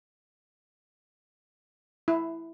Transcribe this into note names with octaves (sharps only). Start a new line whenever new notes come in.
E4